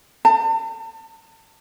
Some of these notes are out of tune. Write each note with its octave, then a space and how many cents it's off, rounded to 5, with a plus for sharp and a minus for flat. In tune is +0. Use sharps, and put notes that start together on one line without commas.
A5 +40